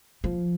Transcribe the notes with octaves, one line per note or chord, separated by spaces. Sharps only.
F3